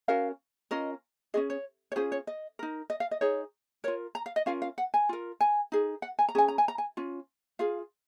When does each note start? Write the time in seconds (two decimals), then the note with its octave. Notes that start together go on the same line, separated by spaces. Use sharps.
0.08 C#4 F#4 A#4 F5
0.71 C#4 F4 A#4 D#5
1.34 C#4 F4 G#4 D#5
1.50 C#5
1.92 C#5
1.96 C#4 F4 G#4 C5
2.12 C#5
2.27 D#5
2.59 D#4 A#4
2.90 D#5
3.00 F5
3.11 D#5
3.21 D#4 G#4 C#5
3.84 F4 A#4 C#5
4.15 A#5
4.26 F5
4.36 D#5
4.46 C#4 F4 A#4 F5
4.62 F5
4.78 F#5
4.94 G#5
5.09 F4 A#4
5.41 G#5
5.72 D#4 G#4
6.02 F#5
6.19 G#5
6.29 A#5
6.35 C#4 G#4 G#5
6.48 A#5
6.58 G#5
6.68 A#5
6.78 G#5
6.97 C#4 F4
7.59 F4 G#4 F5